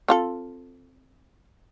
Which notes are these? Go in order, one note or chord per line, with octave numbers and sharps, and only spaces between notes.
C4 F4 A4